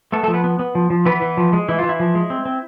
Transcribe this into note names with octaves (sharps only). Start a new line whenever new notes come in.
A3 B3 A4
A3 A4
F3
B3 B4
B3
B3
F3
F3
E3 B3 B4
E3
F3
G#3
E3 E4
E3 F4
E4
F3
G#3
C4
C4